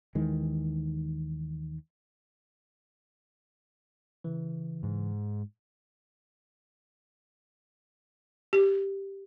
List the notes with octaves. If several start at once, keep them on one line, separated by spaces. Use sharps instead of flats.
D#2 D#3 E3 G#3
C#3 E3
G#2
G4